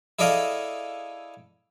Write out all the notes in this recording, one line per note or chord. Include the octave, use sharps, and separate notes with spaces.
E4 G#4 A4 D5 D#5 F5